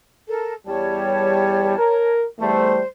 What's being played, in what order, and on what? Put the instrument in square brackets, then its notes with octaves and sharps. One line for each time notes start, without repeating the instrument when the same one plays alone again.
[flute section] A4 A#4 A5
[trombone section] E2 G3 [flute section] C#5 A5
[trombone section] A#4
[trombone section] E2 G3 A3 [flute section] C5